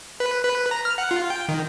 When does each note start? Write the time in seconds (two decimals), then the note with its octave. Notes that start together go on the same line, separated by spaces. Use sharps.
0.20 B4
0.44 B4
0.71 A#5
0.85 F6
0.98 F#5
1.11 F4
1.30 G5
1.49 D#3